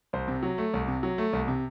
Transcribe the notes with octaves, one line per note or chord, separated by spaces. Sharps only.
C2 C5
C3
F#3
A3
C2
C3
F#3
A3
C2
C3